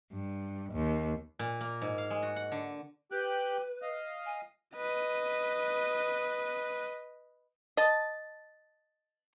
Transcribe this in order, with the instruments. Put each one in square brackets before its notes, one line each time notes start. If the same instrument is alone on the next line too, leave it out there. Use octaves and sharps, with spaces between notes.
[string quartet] G2
D#2
[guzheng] A#2
A#3
G#2
F5
G#3
F#4
F#5
D3
[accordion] G4 G5 F#6 [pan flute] B4
[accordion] D#5 F5
[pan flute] G#5
[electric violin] B4 D#5
[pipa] D#5 A5